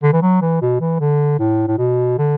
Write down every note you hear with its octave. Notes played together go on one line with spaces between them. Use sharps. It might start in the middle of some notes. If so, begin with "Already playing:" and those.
D3
E3
F#3
E3
B2
E3
D3
A2
A2
B2
D3